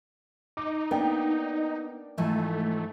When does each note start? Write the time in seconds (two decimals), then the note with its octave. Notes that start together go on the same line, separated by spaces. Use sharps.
0.57 D#4 D6
0.91 A#3 B3 D4 G5
2.18 G#2 E3 F3 A3